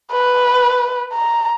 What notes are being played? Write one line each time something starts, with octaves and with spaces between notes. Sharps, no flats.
B4
A#5